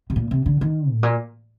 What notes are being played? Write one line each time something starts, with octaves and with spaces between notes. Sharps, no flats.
C3
A#2
C3
D3
D#3
A2
A#2